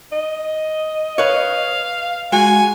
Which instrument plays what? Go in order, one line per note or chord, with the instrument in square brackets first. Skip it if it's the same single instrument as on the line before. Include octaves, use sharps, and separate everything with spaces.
[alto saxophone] D#5
[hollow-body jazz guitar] B4 C#5 [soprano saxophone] F5
[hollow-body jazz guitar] G#3 [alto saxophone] F#4 [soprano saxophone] G#5